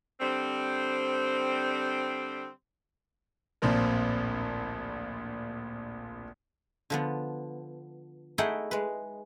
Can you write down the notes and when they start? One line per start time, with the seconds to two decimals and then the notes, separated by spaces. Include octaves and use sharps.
0.20 D3 G3 C4
3.62 D1 A#1 A#2 F3 C4 A#4
6.90 D3 F3 B3
8.38 A3 D#4 E4 G#4 F#5 G5
8.71 G#3 B4